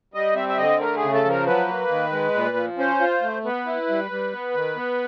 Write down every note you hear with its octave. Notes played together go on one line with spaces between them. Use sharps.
G3 D#5
C4 E5
E5
D3 D#5
A3 A#4
G#4
C#3
A4
F3 A#4
F#3 B4
A#3
D#3
G#3
A#2
F3
C#4 C5
F4
A3
B3 B4
E4
G3
G3
B3
D#3
B3